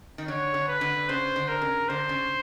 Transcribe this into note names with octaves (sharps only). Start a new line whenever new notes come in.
D#3
D3 C#5
D3
B4
D3
C#3 C5
D3
A#4
C#3
D3 C5
C#3